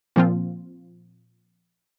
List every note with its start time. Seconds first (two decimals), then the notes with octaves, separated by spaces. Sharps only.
0.16 A#2 F3 C4 F4